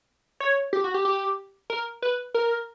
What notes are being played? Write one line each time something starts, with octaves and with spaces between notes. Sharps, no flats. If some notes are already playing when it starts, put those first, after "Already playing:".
C#5
G4
F#4
G4
G4
A#4
B4
A#4